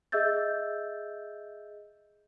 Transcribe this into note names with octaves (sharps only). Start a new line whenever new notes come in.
G#4 D#5 E5 E6 G6 A6